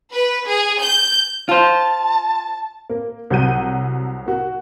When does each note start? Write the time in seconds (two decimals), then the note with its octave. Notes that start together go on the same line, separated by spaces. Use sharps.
0.12 B4
0.46 G#4
0.81 G6
1.49 F4 C5 A5
2.90 A#3
3.30 C2 F#3 F#5 G6 D#7
4.26 A#3 F#4